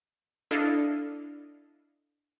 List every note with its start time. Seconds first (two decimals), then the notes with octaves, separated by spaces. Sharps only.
0.51 D4 E4 A4 D#5 F5